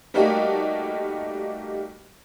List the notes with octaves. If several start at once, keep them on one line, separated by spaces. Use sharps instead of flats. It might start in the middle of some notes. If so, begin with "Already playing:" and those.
G3 A3 A#3 D#4 F#4 G4